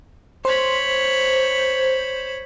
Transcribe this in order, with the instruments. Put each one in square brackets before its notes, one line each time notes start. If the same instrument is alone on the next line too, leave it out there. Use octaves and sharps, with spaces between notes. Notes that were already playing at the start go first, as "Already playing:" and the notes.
[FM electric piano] C5 [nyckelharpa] C#5 B5